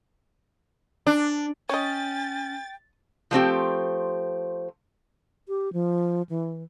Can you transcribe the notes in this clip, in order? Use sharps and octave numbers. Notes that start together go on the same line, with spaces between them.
D4
C#4 C#5 D#5 G5 A6
F3 A3 C4 G4
G4
F3
E3